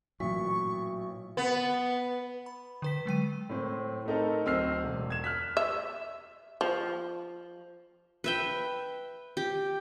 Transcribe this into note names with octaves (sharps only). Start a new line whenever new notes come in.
A1 A#2 F#3 C#6 B6
B3
B5
D3 B4 B6
F#3 G#3 G5 D#7
A2 C4 C5 C6
A3 C4 D#4 A4 A#4
D1 C4 D#5 E6 F6 C7
E1
G#6 E7
F6 F#6 B6
E5
F3
B4 E5 G5
G4